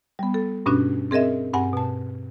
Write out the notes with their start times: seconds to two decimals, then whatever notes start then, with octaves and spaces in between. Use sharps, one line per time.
0.19 G3 B3
0.34 A4
0.66 G2 B2 C#4 D4 F#4
1.11 C4 G#4 A#4 D#5 E5
1.54 G2 C4 F#5 G#5
1.73 B2 A5